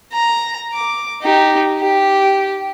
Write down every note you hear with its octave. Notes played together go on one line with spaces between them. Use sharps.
A#5
D6
D#4 G4
G4